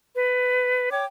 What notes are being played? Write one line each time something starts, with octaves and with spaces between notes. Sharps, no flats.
B4
C#5 G5 D6